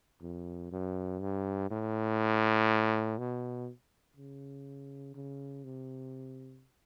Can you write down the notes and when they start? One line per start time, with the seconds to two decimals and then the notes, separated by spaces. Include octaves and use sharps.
0.22 F2
0.72 F#2
1.21 G2
1.70 A2
3.18 B2
4.17 C#3
5.15 C#3
5.64 C3